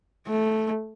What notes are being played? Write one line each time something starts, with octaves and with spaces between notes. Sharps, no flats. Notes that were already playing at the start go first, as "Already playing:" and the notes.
A3